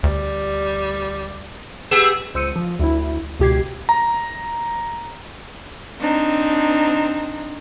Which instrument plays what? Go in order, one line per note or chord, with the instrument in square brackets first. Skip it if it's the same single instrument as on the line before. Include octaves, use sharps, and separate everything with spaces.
[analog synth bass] D2 [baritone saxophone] G3
[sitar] B3 G4 G#4 [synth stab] E6
[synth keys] C#2 C5 E6 C#7 D#7
F3
D2 E4
C#2 B2 G4 D6 G#6 C7
[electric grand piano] A#5
[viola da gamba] C4 D4 D#4